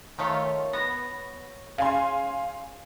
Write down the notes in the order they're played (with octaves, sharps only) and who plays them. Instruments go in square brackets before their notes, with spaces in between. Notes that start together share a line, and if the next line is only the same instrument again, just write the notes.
[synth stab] D#3 A3 F4 [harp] C#5 B6
[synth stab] B3 [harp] A#6
[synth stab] C#3 [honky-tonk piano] F5 G#5 C6